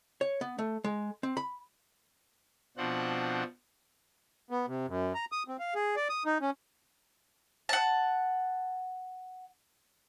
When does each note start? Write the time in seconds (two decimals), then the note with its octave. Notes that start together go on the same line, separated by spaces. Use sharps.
0.21 C#5
0.41 B3
0.58 A3
0.84 G#3
1.23 C4
1.37 B5
2.77 B2 F3 C4 D4 F#5
4.50 B3
4.67 C3
4.88 F#2
5.15 A#5
5.32 D#6
5.48 C4
5.60 F5
5.75 G#4
5.96 D5
6.10 D#6
6.26 D#4
6.41 C#4
7.69 F#5 A5